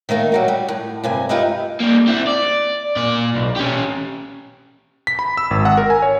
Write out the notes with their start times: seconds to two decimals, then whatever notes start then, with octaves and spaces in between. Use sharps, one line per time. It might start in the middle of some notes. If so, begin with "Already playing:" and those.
0.09 D#3 A3 A#3 D#4
0.32 F#3 G3 F#4
0.48 G3
0.68 A2
1.04 G2 C3 G#5
1.29 D#4 F4 G4 B4 D#5 E5
1.81 G3 A#3
2.07 C4 E4
2.27 D5
2.96 A#2 D5
3.36 B1
3.56 C#4 G4
5.07 B6
5.19 B5
5.37 E6
5.51 G#1
5.65 F#5
5.77 A#4
5.90 G#5
6.02 C#5